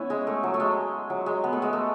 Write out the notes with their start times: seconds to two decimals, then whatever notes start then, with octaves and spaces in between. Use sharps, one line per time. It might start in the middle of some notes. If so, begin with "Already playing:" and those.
Already playing: B3 C#4 E4
0.10 G#3
0.27 A3
0.43 F#3
0.54 A3
0.60 G#3
1.10 F#3
1.26 G#3
1.44 B3
1.53 A3
1.62 G#3
1.73 A3